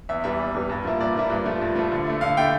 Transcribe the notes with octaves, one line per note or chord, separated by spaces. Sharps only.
E2 E5
E3 G3 E5
E2
E3 G3
G2
F3 A#3 E4
G2 D5
F3 A#3 E4
G2
F3 A3
G2
F3 A3
D3
A3 E4
D3 F5
A3 E4 G5